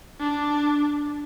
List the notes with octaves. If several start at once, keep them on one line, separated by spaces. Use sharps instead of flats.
D4